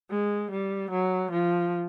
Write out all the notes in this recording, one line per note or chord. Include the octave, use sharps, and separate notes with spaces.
G#3
G3
F#3
F3